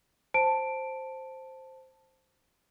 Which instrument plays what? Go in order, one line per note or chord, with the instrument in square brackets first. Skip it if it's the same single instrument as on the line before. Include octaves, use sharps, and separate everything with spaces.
[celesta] C5 A5 D7